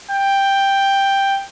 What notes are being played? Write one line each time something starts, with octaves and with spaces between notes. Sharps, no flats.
G5